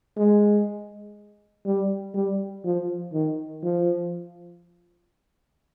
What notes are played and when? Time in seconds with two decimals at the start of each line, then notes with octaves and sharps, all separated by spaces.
0.17 G#3
1.65 G3
2.14 G3
2.64 F3
3.13 D#3
3.63 F3